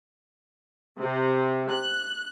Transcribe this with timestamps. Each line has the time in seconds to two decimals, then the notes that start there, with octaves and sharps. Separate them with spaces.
1.01 C3
1.72 F#6